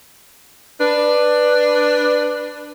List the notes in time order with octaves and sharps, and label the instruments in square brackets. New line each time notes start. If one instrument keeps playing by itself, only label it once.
[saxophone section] D4 B4